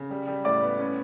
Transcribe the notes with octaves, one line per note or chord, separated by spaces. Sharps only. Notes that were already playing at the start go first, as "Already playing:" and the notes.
Already playing: C#3
G3
G3
A2 D5 D6
B3
C#4